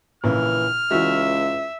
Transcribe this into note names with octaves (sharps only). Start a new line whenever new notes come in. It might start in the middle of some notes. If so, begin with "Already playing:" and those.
A#1 C#3 E3 F6
C#2 E3 F#4 E5